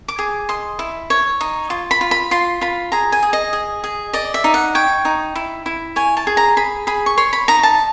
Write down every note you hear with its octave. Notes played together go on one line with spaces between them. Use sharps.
D6
G#4
D#5 C6
E4
C#5
D#4
F4
B5
F4
B5
F4 C6
F4 B5
G#4 A#5
G#5
G#4
D#5
G#4
G#4
D5 D#5
E5
D#4
F#5
C#5 G5
D#4
E4
E4
C#5 G#5
A5
G#4
A#5
G#4 B5
G#4 B5
C#6
C#5 C6
B5
D#4 A#5
A5